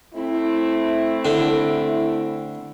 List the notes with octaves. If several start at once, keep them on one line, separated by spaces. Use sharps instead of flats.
A3 C4 E4
D3